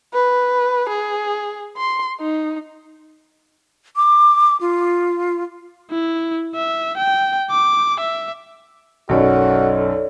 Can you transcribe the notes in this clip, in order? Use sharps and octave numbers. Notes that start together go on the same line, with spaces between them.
B4
G#4
C6
D#4
D6
F4
E4
E5
G5
D6
E5
B1 F#2 F#4 A4 C#5 D5